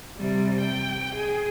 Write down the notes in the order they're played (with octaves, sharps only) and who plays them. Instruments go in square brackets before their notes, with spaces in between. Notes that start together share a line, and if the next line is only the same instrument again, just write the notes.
[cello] C3 G3
G5
G#4